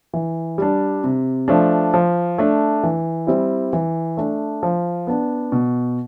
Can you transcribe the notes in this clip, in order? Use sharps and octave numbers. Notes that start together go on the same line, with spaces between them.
E3
G3 D4
C3
F3 A3 D4
F3
A3 D4
E3
G3 C4 E4
E3
A3 D4
F3
B3 D4
B2